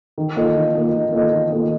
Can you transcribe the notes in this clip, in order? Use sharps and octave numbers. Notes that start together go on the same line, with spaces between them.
D#3
A#3 F4 A4 D#5
D#3
A#3 F4 A4 D#5
D#3
A#3 F4 A4 D#5
D#3
A#3 F4 A4 D#5